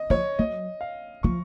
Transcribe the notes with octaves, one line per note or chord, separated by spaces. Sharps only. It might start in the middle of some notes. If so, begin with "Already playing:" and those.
Already playing: D#5
F3 C#5
F#3 D#5
F5
F3 C#6